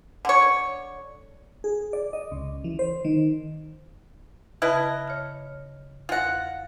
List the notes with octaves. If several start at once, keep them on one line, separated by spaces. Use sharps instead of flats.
D3 C#5
G#4
D5
D#5
C#2
E3
C5
D#3
C#3 E4 B4 D#5 A5
C#5 F6
E2 F4 F#5 A#6